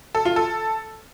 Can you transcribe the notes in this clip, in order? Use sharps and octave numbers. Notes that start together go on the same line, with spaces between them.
A4
F4
A4